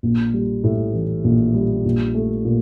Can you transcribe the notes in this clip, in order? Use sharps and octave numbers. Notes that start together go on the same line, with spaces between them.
A#1
G3
A2
E3
A#1
G3
A#1
A3
A#2